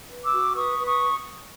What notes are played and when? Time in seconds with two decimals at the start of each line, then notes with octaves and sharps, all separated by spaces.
0.09 B4
0.24 D6 E6
0.32 F#4
0.55 B4 C#6 D#6
0.79 B4
0.86 C#6 D#6